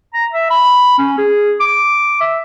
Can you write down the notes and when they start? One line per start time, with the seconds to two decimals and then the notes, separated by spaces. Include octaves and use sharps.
0.14 A#5
0.32 E5
0.50 B5
0.98 C#4
1.18 G#4
1.60 D6
2.20 E5